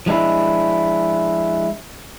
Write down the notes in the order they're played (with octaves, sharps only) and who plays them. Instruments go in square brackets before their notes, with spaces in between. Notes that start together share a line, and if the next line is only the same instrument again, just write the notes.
[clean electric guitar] F3 G#3 D4 E4